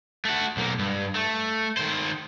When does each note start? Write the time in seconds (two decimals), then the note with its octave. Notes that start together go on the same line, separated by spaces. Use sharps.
0.25 A3 F#4
0.57 B1 A#3
0.79 G2
1.15 A3
1.77 D#3 C5